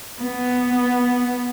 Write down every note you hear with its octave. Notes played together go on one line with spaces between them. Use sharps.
B3